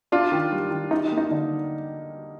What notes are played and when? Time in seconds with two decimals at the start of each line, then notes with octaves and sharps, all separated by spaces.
0.12 D4 F4
0.32 D#3
0.52 G3
0.71 D#3
0.91 G3 D#4
1.12 A#3
1.18 D#4
1.31 D3